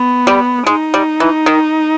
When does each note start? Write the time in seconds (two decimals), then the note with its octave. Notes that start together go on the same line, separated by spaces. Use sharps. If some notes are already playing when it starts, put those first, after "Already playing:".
Already playing: B3
0.27 G3
0.67 G#3 D#4
0.94 G3
1.20 E3
1.46 D#3